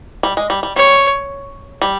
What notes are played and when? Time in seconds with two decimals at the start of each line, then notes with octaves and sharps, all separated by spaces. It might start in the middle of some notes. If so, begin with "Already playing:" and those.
0.23 G3
0.37 G#3
0.50 G3
0.63 G3
0.76 G3 C#5
1.82 G3